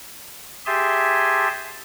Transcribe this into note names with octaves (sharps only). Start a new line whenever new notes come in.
G4 G#4 E5 G#5 A5 C6